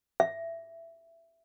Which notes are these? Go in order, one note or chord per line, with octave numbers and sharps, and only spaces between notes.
E5